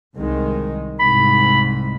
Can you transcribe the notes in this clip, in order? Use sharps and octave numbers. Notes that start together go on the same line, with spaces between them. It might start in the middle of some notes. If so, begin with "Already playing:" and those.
C2 D#3 G#3
C2 G#2 B5